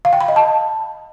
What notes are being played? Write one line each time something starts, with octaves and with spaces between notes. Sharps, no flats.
F5
G5
B5
D#5
A5